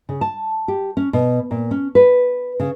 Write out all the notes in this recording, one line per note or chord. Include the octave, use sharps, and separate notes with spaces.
C#3
A5
G4
C#4
B2
A#2
C#4
B4
C#3